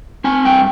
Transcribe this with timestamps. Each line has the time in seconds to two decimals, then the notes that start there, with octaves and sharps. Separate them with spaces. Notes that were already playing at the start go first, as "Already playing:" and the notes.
0.24 C4 G#5
0.45 G2 G5